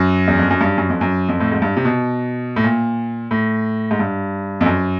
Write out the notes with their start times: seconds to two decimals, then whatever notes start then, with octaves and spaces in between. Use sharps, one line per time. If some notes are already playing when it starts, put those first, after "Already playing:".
Already playing: F#2
0.28 E2
0.38 F2
0.50 F#2
0.61 G2
0.78 F#2
0.90 F2
1.01 F#2
1.29 F2
1.40 A2
1.52 G#2
1.62 G2
1.77 C3
1.85 B2
2.56 A2
2.64 A#2
3.31 A2
3.91 G#2
3.99 G2
4.61 F2
4.66 F#2